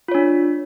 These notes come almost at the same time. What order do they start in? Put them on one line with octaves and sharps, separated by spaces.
F4 C#5 D4